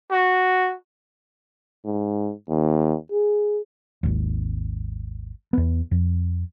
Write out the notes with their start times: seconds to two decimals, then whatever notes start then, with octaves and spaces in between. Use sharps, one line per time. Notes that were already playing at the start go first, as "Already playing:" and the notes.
0.11 F#4
1.85 G#2
2.49 D#2
3.12 G#4
4.03 G#1 D#2
5.53 E2 B3
5.91 F2